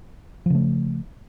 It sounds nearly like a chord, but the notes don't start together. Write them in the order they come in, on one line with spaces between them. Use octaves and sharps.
F3 C#3 A3